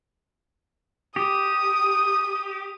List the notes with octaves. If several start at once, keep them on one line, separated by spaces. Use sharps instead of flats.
G4 D#6